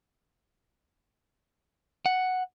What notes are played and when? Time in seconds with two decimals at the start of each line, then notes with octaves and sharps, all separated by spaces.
2.06 F#5